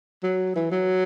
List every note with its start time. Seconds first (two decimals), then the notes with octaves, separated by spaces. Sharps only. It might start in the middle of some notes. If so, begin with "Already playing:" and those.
0.23 F#3
0.56 E3
0.72 F#3